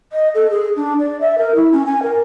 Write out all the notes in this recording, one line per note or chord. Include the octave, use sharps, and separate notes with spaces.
D#5
A4
G#4
D4
D5
E5
A#4
E4
C#4
G#5
A#4